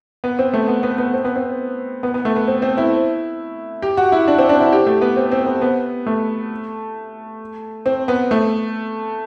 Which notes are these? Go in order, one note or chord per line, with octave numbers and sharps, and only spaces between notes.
B3
C4
A3
B3
B3
B3
C4
B3
C4
B3
B3
A3
B3
C4
C4
E4
G4
F#4
E4
D4
C4
D4
E4
G4
A3
B3
C4
C4
B3
B3
A3
C4
B3
A3